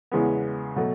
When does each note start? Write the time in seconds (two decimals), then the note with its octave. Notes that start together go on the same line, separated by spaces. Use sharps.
0.12 E2 C#3 E3 G#3 B3
0.76 B2 F#3 A3